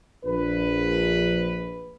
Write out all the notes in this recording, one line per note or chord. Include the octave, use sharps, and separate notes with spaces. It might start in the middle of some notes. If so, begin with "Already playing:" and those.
A#1 B4